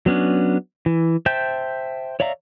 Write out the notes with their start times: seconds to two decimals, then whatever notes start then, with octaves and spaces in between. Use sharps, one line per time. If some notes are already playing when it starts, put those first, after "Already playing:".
0.06 F#3 B3 C#4 D4
0.86 E3
1.26 C5 E5 G5 A5 G6
2.20 C#5 D5 E5 F5 A#5